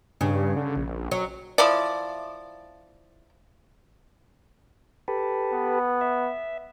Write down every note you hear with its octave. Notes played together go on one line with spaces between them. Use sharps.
G2 C#3
D3
A#1
F#3
F3 E4 D5
G4 A4 B4
B3
E5